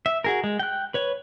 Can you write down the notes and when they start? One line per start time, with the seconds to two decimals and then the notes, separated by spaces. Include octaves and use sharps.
0.06 E5
0.24 F#4 G#4 A#4
0.44 G#3
0.59 G5 F#6
0.94 B4 C#5